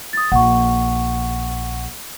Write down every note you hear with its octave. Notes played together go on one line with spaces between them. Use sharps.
D#6 A6
A#1 F#5 C#6